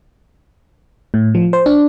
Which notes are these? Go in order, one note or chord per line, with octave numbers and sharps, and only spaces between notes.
A2
F3
C5
D4